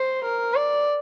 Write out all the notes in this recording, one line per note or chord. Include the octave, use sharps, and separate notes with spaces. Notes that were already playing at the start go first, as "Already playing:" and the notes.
Already playing: C5
A#4
D5